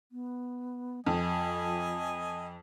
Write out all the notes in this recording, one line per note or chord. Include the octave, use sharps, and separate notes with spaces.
B3
F2 F3 D#5 G#5